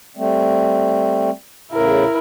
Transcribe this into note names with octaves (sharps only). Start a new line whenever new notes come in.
G3 A3 C4
E2 A2 C#3 E4 A#4